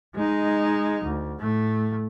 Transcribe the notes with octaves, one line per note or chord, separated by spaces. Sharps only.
G#3 D#4
D2
A2 A3